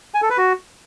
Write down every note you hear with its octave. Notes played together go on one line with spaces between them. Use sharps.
G#5
A4
B4
F#4